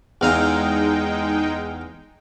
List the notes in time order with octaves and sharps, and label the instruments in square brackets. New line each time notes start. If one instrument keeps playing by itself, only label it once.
[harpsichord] E2 F5 A#5 [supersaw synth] G#3 D#4 G5